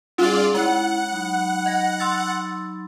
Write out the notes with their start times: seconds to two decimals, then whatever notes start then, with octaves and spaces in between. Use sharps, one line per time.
0.18 G3 C#4 D#4 F4 G#4 D5 G7
0.54 G#3 E4 F#5
1.12 F#3 D#4 B5
1.66 D#5 A#6
2.00 C6 E6 A6